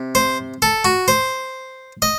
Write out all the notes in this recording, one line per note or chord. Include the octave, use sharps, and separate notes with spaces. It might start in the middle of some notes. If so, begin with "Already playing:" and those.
Already playing: C3
C5
A4
F#4
C5
D#5